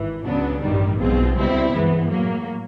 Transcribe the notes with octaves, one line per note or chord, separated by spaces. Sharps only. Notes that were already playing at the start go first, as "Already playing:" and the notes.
Already playing: G#1 E3
C#2 C#3 F#3 B3 D4
A1 G2 D#3 G3
B1 B2 G#3 C4 F4
C#2 B2 G3 C4 E4
G2 E3 G#3 B3
A2 F#3 A#3